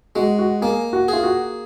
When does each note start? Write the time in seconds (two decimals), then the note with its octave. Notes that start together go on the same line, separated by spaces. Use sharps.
0.16 G#3 F#4
0.39 F#4
0.62 A#3 G#4
0.93 F#4
1.08 F4 G#4
1.23 F#4